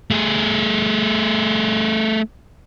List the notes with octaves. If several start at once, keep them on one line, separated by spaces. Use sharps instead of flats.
A3 G#4